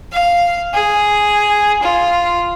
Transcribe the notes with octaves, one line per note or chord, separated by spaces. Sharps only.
F5
G#4
F4